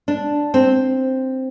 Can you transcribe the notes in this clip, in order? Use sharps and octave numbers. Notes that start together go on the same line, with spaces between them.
D4
C4